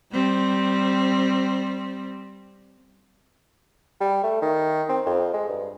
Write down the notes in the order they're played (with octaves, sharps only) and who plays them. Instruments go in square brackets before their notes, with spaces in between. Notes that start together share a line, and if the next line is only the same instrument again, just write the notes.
[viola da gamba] G3 C4
[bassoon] G3
A3
D#3
C4
F2
G#3
G2